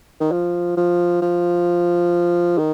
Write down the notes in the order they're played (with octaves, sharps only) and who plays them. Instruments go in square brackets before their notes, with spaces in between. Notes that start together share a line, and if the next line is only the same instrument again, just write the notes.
[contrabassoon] D#3
F3
F3
F3
D#3